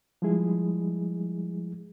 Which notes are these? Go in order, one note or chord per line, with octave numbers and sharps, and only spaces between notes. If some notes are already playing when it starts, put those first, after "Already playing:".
F3 G3 G#3 E4 G#4